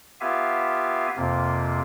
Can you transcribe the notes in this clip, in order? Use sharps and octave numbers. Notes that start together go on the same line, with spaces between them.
B3 F4 G4 E5 F5 G#5
F2 C3 A#3 F4